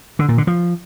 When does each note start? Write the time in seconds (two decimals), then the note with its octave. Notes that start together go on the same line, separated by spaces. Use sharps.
0.19 D3
0.29 A#2
0.38 D3
0.47 F3